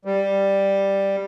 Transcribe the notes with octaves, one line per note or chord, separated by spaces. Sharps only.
G3